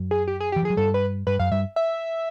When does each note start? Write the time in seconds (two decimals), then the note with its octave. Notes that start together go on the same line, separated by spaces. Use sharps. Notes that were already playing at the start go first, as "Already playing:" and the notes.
Already playing: F#2 F#3
0.11 G#4
0.27 G4
0.40 G#4
0.52 G4
0.56 E3
0.63 F3 G#4
0.70 F#3
0.77 G2 G3 A4
0.94 B4
1.27 G2 G3 B4
1.39 F#2 F#3 F5
1.52 G2 G3 E5
1.76 E5